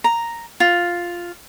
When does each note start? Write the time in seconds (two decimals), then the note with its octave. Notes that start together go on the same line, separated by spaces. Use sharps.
0.04 A#5
0.60 F4